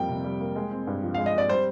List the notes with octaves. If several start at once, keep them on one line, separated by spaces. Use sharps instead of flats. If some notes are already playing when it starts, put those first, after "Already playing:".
Already playing: F2 G3 A#3 G5
C3
G3
A#3
G#3
C4
G2
F3
G#3 F5
D#5
C4 D5
G3 C5